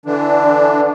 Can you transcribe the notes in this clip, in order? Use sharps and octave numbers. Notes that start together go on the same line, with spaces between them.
D3 E3 D4